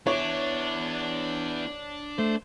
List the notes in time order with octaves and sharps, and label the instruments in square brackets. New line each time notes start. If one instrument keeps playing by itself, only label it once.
[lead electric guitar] B3 E4 [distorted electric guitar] D4 [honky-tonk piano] C#5
[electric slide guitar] A3 [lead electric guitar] C5